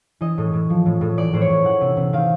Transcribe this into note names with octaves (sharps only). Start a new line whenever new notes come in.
E3 D#5
A2
A2
F3
A2
A2
E3 D5
A2 C5
C#5
A2
E3 F#5
C3
C3
D#3 F5